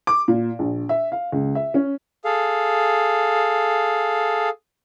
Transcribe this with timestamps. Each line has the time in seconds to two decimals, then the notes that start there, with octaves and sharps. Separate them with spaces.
0.07 D6
0.28 A#2
0.59 A#1
0.89 E5
1.12 F5
1.32 C#2
1.55 E5
1.74 C#4
2.25 G#4 A4 F5